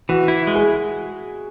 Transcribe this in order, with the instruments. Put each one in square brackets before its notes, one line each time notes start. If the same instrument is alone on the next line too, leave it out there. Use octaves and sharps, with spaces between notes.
[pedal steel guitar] E3 [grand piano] F#4
[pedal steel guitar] E4
G#3
[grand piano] G#4